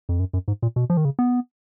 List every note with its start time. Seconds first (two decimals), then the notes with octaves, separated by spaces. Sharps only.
0.09 F2
0.20 F#2
0.33 F#2
0.48 G#2
0.62 A#2
0.76 B2
0.90 F3
0.97 D#3
1.05 C#3
1.19 B3